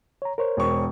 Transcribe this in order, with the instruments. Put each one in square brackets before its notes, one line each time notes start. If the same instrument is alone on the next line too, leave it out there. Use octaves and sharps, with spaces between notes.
[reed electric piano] C#5 A#5
A#4 C5 C#5
[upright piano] E1 C#6